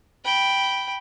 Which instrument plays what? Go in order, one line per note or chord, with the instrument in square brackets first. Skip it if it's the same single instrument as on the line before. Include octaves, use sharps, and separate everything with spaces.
[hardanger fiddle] G5 B5